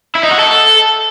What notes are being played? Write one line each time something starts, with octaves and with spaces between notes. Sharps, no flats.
E4
D#4
F#4
A4